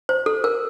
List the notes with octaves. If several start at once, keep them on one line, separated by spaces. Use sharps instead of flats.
C5
A4
A#4